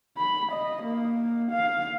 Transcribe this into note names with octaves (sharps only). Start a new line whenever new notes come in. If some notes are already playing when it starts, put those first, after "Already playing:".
B5
D#5
A#3
F5